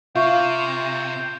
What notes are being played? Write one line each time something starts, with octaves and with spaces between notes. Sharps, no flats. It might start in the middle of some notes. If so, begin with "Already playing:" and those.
C3 F4 E5 F5 C#6 G6